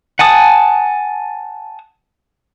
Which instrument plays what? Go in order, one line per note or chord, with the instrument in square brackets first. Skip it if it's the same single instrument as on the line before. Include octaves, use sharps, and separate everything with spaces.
[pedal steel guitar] F#5 G#5 A5 D#6